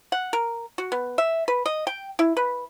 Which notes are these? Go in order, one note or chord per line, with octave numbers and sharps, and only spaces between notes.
F#5
A#4
F#4
B3
E5
B4
D#5
G5
E4
B4